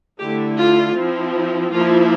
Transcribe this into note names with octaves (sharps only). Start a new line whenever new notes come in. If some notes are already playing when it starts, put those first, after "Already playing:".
D3 A3 E4 G4
F4
F3 C4 E4
F3 A#3 E4 F4